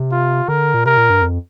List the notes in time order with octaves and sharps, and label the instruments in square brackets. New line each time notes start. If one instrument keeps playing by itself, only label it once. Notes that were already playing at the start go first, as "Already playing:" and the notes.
Already playing: [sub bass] C3
[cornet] F4
[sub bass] D3 [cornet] A#4
[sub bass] A#2
[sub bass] C3 [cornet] A#4
[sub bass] A#2
G2
F2